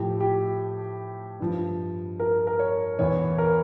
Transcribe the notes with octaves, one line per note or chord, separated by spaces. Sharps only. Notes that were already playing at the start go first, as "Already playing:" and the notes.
Already playing: A2 F3 G4
G4
G2 F3
A#4
A#4
C#5
E2 E3 C#5
A#4